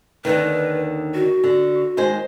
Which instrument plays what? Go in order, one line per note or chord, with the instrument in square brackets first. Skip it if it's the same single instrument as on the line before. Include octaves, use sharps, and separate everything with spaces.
[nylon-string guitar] D#2 D3 D#3 [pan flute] B4
[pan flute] F#4
[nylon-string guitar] D3
D#2 G#3 C5